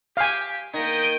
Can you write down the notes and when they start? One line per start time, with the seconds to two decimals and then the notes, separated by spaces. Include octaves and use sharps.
0.17 G4 F5 G#5
0.74 D#3 A#3 B3 G#4 D#5 G6 D7 D#7